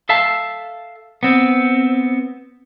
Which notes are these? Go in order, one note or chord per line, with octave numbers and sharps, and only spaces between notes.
A4 E5 F5 A5
B3 C4